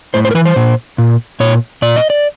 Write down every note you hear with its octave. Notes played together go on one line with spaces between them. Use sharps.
A2 C5
C5
A#4
E3 B4
C5
A#2
A#2
A#2 C#5
A#2 D5
D#5
D5